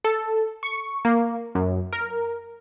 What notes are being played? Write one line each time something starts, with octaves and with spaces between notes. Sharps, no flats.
A4
C#6
A#3
F#2
A#4